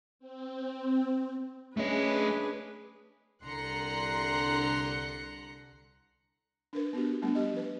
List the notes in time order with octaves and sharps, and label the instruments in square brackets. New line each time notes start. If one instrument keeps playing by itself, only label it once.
[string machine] C4
[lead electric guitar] A3 D#5 [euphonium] C#4 [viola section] D4 G#4 B4
[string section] C2 D3 A#5 C6 F#6 C#7
[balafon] D4 A#4 B4
B3 D4 F#4 G4
G3 A3 B3 D4
G4 D#5
F3 B4